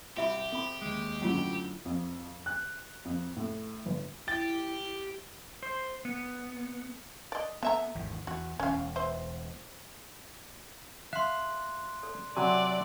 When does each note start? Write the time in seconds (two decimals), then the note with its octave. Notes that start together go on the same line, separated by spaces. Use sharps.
0.16 C2 F#4 G4 E5 B5
0.52 C4 A4 B5
0.82 D#2 G#3
1.22 F#2 A2 D3 C#4 F4
1.86 F2
2.46 F#6
3.05 F2
3.37 A2
3.86 G1
4.28 E4 G4 A6
5.63 C5
6.05 B3
7.32 D5 D#5
7.63 A3 B3 E5 A#5
7.95 G#1 E2 D#3
8.27 E2 F#4
8.60 E1 E2 C#4 F5
8.96 B4 C5 E5
11.13 E5 F5 C6 F#6
12.03 A4 D5
12.36 C3 F#3 F#4 D5 F#5 G#5 B5